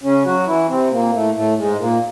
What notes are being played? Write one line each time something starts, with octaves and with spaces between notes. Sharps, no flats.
C#3 C#4
F#3 F#4
E3 E4
C3 C4
A#2 A#3
A2 A3
A2 A3
G#2 G#3
A#2 A#3